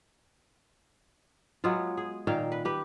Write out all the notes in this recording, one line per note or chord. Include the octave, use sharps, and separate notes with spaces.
F#3 G#3 B3 F4
G#4
A#2 D#3 F5 G5
B4
G4 B4